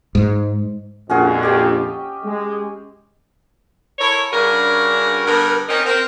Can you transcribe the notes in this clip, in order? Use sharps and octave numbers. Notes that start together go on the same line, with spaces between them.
G#2
A#1 F2 C#4 F#4 G#4
G4 D#5 G5
G#3
E4 A4 A#4 C#5
G2 C#3 D4 F#4 G#4 A#4
G2 D3 B3 A#4
C4 C#4 D#4 A#4
C4 A#4